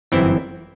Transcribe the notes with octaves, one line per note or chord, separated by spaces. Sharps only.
G1 F#2 E3 C4 E4